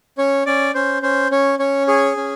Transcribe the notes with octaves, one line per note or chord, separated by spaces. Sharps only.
C#4 C#5
C#4 D5
C#4 C5
C#4 C5
C#4 C#5
C#4 C#5
G#4 C#5
C#4